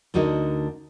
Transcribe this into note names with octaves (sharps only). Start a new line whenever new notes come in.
D2 D3 D#4 F#4 A#4 D#5